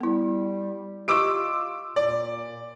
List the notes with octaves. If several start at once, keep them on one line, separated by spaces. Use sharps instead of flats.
G3 B3 E4
F4 G4 D#5 C#6 D6 E6 D7
A#2 D5